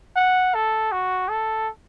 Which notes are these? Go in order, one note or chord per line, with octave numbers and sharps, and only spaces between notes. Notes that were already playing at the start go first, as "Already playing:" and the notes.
F#5
A4
F#4
A4